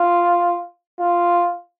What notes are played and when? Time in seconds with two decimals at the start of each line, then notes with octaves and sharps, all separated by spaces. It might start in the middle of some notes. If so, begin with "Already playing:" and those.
Already playing: F4
0.99 F4